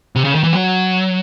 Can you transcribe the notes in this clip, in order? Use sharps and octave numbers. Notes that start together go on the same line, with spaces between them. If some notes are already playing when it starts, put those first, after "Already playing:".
C3
C#3
D#3
E3
F#3